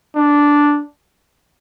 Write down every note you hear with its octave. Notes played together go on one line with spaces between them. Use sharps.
D4